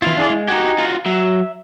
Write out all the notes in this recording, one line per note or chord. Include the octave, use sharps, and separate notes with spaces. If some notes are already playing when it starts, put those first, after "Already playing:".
E3 E4 F4 F5
D4 G#4 D5
G#3
D#4 F#4 G4 F#5 G#5
F4 F#4
F#3 E5